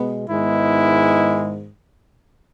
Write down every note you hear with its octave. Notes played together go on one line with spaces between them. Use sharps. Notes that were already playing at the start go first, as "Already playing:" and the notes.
Already playing: B2 G#3 B3
G#2 D#3 G#3 B3 E4